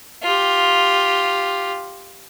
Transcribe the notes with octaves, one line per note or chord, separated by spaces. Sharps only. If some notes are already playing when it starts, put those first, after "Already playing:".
F4 G4